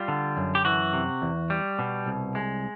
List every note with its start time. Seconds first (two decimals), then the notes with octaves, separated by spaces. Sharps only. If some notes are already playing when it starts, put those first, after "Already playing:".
Already playing: G3 F4
0.08 D3
0.37 F#2
0.55 G4
0.65 E3 F#4
0.93 C3
1.22 E2
1.50 G3
1.79 B2
2.06 C2
2.35 G#3